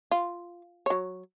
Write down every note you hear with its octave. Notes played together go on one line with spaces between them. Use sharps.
F4
F#3 C#5